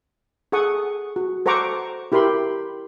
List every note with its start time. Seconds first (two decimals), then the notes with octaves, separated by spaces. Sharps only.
0.52 G#4 A4 F#5 C#6 D#6
1.16 F#4
1.46 A4 C5 F#5 A#5 C#6 D6
2.12 E4 G4 A#4 B5 C6